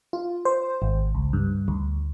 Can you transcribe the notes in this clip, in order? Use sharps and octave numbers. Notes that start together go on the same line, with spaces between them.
F4
C5
G#1
C#2
G2
D2